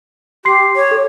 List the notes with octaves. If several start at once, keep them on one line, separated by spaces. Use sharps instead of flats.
G4 C6 C7
C#5
A4